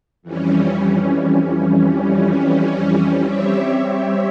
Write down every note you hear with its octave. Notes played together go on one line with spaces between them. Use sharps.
F2 E3 G3 C#4
G3 C4 G4 C#5 E5